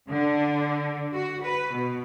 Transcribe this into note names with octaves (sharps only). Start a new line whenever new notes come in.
D3
F#4
B4
B2